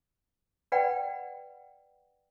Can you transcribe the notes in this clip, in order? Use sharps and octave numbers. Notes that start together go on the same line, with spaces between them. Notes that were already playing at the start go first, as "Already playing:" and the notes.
B4 D5 F#5 G5 B5